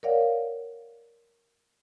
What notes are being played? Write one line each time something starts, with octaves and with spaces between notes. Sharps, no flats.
A#4 C#5 D5 F5 F#5